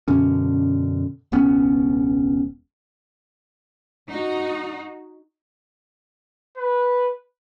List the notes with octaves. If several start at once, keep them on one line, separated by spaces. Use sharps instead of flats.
F#2 B2 D3 C#4
E1 C#2 B3 C#4
D#4 F#4
B4